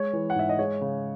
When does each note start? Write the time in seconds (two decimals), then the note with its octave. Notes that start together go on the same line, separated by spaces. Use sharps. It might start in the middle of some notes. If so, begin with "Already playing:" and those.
Already playing: G#3 C#5
0.13 E3
0.30 F#5
0.35 G#2 E5
0.49 D#5
0.59 G#3 C#5
0.81 C#3